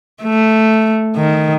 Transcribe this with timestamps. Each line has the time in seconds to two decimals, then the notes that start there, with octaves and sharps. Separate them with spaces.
0.23 A3
1.16 D#3